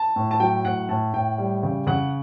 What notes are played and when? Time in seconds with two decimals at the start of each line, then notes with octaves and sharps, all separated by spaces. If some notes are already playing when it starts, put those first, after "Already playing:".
Already playing: A5
0.16 A2
0.31 A5
0.40 F#3 G5
0.65 A2 F#5
0.89 A2 A5
1.13 A2 G5
1.38 G3
1.63 C#3
1.87 C#3 F#5